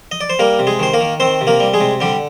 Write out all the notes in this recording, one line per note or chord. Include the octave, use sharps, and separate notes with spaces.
D#5
D5
C5
G3 A#3 A#4
C3
G#3 G#4
D#3 C5
A#3 A#4
D#3
D#3 C4 C5
C3
A#3 A#4
G3
G#3 G#4
C3
D3 G3 G4